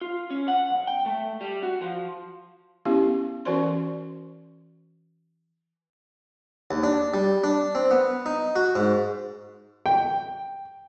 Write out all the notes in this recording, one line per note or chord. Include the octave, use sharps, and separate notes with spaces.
F4
C#4
F#5
B1
G5
A3
G3
F#4
F3
B3 C#4 E4 G4
E3 C#4 F#4 C5 D5 C6
D#2
D4
G3
D4
C4
B3
D#4
F#4
G#2
G5